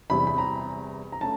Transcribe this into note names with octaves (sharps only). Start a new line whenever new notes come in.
E2 C3 E3 G3 B5
B5
A#5
A#5
A3 C#4 A5